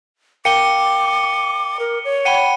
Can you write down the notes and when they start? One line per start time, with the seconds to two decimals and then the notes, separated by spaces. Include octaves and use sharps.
0.45 A#4 F5 G5 D6 C#7 D#7 G7
1.80 A#4
2.05 C#5
2.25 F#5 G5 B5 C#7 D#7 G7